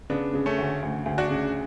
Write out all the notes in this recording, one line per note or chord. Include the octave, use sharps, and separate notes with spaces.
C#3 B3 D4
C#3
A3 C#4
D2
D2
D2
D4 F#4
C#3